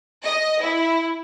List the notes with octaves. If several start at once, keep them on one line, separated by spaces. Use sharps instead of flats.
D#5
E4